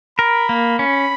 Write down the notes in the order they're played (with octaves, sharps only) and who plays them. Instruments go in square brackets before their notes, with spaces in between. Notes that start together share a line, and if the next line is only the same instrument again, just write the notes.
[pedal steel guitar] A#4 [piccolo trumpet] B5
[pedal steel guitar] A#3
[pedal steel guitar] C#4 [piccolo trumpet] B5